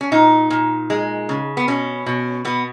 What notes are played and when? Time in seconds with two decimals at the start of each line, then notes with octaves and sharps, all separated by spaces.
0.01 C#4
0.12 A#2 D#4
0.50 A#2
0.90 G#3
1.29 C#3
1.57 B3
1.68 B2 C#4
2.06 B2
2.45 B2 B3